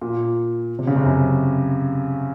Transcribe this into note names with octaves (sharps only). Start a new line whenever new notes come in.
A#2
C3
C#3
C3
F#2